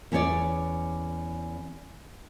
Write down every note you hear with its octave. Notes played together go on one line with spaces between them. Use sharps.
E2 C#4 G#4 C#5 D5